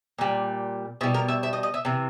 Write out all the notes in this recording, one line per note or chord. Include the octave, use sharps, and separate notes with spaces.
A#2 G3
B2 G3 E4
A#4
E5
E5
D#5
D#5
E5
C3 E3